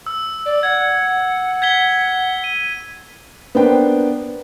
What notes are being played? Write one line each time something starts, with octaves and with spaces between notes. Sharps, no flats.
E6
D5
F#5 G#6
G#6 B6 G7
D#7
B3 D4 A#4 C5 G5